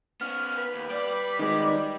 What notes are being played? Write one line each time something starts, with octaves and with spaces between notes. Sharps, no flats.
B3 C#4 F6
B4
D#2
G3 D5 D6
D#3 G#3